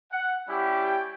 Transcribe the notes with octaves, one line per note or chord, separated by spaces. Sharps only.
F#5
G3 C#4 E4 G4
G5